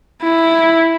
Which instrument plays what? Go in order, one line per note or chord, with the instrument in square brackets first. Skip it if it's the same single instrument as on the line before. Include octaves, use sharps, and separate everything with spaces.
[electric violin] E4